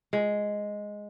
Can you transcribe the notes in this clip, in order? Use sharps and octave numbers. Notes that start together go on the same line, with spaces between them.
G#3